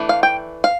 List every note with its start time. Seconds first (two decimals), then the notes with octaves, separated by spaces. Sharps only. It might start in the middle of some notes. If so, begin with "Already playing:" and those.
Already playing: E3 A3 D4
0.09 F5
0.23 G5
0.64 F5